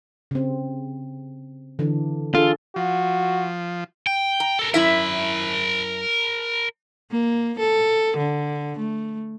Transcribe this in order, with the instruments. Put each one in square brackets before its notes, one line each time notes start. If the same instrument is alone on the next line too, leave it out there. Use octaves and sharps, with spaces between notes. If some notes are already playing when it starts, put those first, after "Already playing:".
[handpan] C#3 C4
D3 E3 D4
[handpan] D4 G#4 A4 [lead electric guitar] F4
[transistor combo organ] F3 [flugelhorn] F#4
[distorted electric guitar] G5
[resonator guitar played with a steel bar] A#5
[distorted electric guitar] A4 A#4
[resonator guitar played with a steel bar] F#2 E4 E5 [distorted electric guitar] A#4 B5
[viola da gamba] A#3
A4
D3
A3